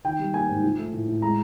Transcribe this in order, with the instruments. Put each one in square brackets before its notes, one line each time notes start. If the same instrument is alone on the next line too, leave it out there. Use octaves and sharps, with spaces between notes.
[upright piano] D#3 G5
G3
A#3 G#5
G#2
F3
A3
A2
A2
G#3 A#5